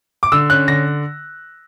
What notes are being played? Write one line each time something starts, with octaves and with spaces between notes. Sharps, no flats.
D6
D3 E6
C#4 F#6
D3 A#6